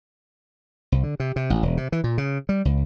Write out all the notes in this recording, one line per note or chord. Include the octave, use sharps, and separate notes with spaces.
C2
D3
C3
C3
A1
E1
C3
E3
A#2
C#3
G3
C#2